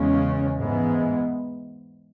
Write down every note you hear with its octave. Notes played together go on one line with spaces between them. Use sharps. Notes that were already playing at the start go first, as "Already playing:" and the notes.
Already playing: E2 C#3 G#3 C#4
G#2 E3 G#3 B3